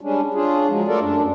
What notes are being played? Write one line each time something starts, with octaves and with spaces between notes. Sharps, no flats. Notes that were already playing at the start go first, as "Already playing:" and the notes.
G3 G#3 C#4 D4
C#4 D4 F4 G#4
F3 F#3 G#3
A3 F4 A4 A#4 D5
F#2 D4